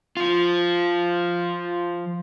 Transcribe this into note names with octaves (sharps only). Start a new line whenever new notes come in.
F3 F4